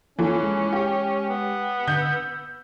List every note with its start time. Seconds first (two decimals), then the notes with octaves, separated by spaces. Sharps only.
0.19 E3 A#3 C#4 F4 A4
0.43 G#3
0.73 G4
1.29 B3
1.88 D3 G6
2.02 E6